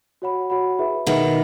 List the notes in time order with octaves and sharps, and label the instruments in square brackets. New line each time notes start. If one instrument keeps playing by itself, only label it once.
[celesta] F#4 C#5 F#5 B5
F#4 C#5 F#5 B5
E4 G#4 B4 E5 B5
[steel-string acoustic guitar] B2 D#3 [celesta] E4 G#4 B4 E5 B5